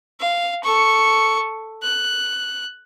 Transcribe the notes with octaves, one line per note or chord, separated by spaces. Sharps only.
F5
A4 C#6
F#6